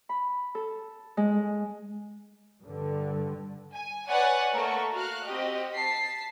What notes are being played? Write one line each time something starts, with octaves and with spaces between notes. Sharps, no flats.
B5
A4
G#3
G2 D3
G#5
B4 C#5 D5 F#5 G#5
A3 A#3 A#4 C#6
F#4 F5 F6 F#6
C4 F#4 G4 D#5
A5 B6 C7